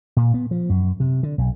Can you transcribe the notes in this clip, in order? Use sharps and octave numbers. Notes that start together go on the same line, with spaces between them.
A#2
B3
F3
F#2
C3
D3
B1